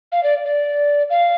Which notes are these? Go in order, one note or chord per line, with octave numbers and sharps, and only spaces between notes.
F5
D5
D5
F5